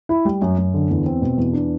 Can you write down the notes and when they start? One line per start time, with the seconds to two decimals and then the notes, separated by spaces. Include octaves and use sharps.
0.09 E4
0.25 G3
0.42 F#2
0.58 F#2
0.74 D3
0.90 E2
1.06 C4
1.22 B2
1.37 E2
1.53 D4